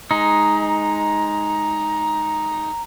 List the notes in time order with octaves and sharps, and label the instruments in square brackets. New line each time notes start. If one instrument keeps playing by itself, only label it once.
[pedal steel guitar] G#3 D#4 [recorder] A#5